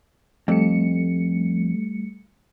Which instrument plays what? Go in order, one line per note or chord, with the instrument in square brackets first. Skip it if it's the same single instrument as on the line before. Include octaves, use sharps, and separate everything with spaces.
[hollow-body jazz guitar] F2 [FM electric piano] G3 A3 C#7